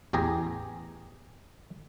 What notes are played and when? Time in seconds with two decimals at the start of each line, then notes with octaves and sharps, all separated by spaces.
0.13 A1 E2 G4 G#4 A#5